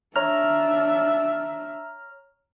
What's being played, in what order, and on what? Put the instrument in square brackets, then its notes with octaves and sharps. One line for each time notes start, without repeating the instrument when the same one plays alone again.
[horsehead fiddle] D4 E5 [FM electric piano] C#5 A#5 F6